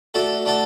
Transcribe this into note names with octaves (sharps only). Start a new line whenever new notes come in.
A3 D4 F#4 A4
A3 D4 F#4 A4